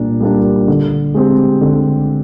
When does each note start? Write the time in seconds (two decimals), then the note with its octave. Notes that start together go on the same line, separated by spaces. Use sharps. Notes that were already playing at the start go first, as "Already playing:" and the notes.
Already playing: A#2 G3 A#3 D4
0.20 G3 A#3 D4
0.68 D3
1.14 G#3 C4 G4
1.61 D3